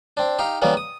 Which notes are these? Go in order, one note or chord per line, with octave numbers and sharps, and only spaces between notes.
C4 D4
D#4 G4 F5
C#3 E3 G3 A#3 B3
D#6